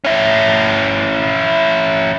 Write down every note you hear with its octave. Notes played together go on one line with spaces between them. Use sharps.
C#4 E4